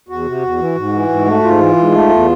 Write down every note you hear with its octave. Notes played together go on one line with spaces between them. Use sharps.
E2 F#4
C3
E2
E3
G#2
E3
G#2
A3
G#2 F4
E3
G#2
A3
E2